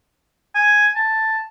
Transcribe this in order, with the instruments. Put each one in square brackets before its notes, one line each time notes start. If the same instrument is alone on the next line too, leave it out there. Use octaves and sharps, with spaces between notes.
[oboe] G#5
A5